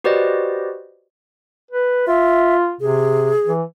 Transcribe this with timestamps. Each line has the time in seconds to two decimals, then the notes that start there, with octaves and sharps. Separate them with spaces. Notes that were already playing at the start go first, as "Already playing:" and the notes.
0.04 F#4 G4 B4 C5 D5 D#5
1.71 B4
2.07 F4 E5
2.81 C3 G#4
3.47 E3